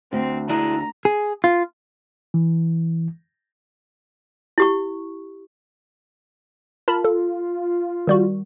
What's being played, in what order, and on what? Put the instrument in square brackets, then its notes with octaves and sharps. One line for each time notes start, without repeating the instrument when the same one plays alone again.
[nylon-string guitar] D2 [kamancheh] C4
[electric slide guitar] D4 E4 G#4 [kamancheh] A#5
[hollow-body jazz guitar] G#4
F4
[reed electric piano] E3
[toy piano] E4 G4 C#6
[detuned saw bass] F4 [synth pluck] A#4 A5 B5
[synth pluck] A4
D#3 G3 F#4